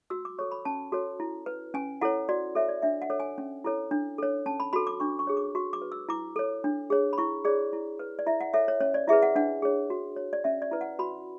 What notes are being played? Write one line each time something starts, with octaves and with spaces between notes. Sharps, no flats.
F#4 E6
D6
A4 C#5 C#6
B5
C#4 A5
F#4 A4 C#5
E4
B4
C#4 G#5
E4 A4 C#5 F#5
F#4 D5
A4 C#5 E5
D5
D4 E5
F#5
A4 C#5
G#5
C#4
E4 A4 C#5
D4
A4 C#5
C#4 A5
B5
F#4 A4 B5
D6
D4 C#6
C#6
G#4 C#5
D6
F#4 C#6
D6
B4
E6
E4 D6
A4 C#5
D4
G#4 C#5
B5
E4 C#6
G#4 C#5 D5
E4
B4
D5
E4 E5
F#5
A4 C#5 E5
C#5
C#4 C#5
D5
E4 G#4 B4 E5
F#5
D4 F#5
G#4 C#5
F#4
C#5
D5
C#4 E5
D5
E4 B4
F#5
F#4 B5